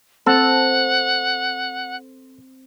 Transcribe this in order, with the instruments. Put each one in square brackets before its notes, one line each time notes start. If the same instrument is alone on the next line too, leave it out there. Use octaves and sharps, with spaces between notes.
[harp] C4 [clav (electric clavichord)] A4 [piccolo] F#5